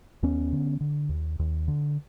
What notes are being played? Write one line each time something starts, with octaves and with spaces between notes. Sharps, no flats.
D#2 B3 C#4
D3
D3
D#2
D#2
D3